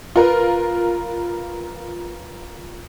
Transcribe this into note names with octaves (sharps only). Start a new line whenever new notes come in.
F4 A#4 B4